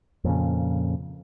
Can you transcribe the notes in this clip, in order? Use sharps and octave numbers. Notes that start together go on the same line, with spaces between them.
F2 A#2 C#3